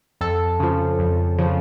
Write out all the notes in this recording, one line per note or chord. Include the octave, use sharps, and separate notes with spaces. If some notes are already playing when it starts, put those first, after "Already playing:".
F2 A4
C#3 F3
F2
C#3 F3